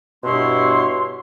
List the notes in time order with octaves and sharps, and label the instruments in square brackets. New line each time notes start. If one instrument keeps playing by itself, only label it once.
[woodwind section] G2 B2 B3 E4 C#5 C6